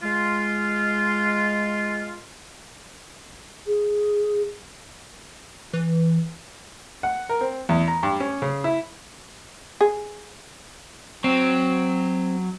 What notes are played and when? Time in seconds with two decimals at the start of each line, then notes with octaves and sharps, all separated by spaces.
0.03 G#3 F4
3.67 G#4
5.73 E3
7.03 F#5
7.29 A#4
7.41 C4
7.69 E2
7.88 A#5
8.03 G2
8.20 C#4
8.42 C#3
8.64 E4
9.81 G#4
11.24 F#3 C4